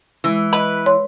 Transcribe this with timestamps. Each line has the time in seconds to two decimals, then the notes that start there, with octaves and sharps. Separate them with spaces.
0.24 E3 G#3 E4
0.53 B4 D#5
0.86 C#5 C6